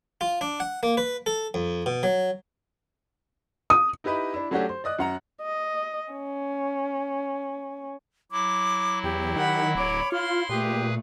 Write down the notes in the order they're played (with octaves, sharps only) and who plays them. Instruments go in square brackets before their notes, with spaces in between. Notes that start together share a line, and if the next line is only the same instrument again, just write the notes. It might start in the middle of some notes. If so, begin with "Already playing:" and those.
[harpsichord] F4
D4
F#5
A#3
B4
A4
F2
B2
F#3
[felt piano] D#6
[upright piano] D#4 E4 G4 B4 D#5 E5
D4 E4
F#3 A3 C#4 D4 F#4 G4
C5
D5 D#5 D#6 F#6
F#2 F#5 A#5
[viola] D#5
C#4
[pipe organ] F#3 E4 [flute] D6
[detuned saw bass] E2 [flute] G4
[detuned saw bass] D#3 [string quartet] F#5 B5
[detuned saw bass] D1 [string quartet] C#5 D6 [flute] B5
[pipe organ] E4 [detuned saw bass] F4 [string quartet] C6 [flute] F6
[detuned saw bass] A#2 [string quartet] A3 [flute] G4 [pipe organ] G#4 B4